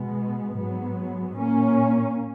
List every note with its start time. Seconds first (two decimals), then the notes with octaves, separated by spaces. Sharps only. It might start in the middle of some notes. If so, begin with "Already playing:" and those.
Already playing: B2 G#3 B3
0.55 G#2 F#3 B3
1.35 A#2 A#3 C#4